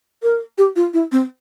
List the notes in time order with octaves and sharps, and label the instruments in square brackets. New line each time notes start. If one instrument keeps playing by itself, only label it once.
[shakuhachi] A#4
G4
F4
E4
C4